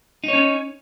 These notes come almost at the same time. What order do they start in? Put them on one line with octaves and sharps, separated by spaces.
D#4 C#5 C#4